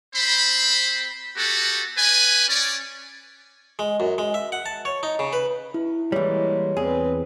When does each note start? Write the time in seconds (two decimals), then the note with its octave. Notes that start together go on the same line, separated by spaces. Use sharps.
0.15 C4 C5 B5
1.37 B3 F#4 G4 A4
1.97 G4 B4 G#5
2.49 C#4 D5
3.79 G#3
4.00 F#2
4.18 G#3
4.34 E5
4.52 F#5
4.66 A5
4.85 C#5
5.03 D#4
5.19 C#3
5.33 B4
5.74 E4
6.12 E3 G3 G#3 A#3 C#5
6.77 E2 C4 G#4 B4